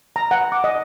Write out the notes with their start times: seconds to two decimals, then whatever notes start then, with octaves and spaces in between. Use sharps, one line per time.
0.16 A#5
0.31 F#5
0.52 D6
0.64 D#5